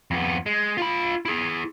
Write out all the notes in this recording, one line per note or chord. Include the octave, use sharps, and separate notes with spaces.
F2 B3
G#3
F4 B5
E4 G#4